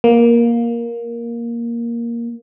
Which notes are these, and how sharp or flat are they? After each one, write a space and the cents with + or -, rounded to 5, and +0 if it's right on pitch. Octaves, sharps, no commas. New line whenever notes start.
A#3 +10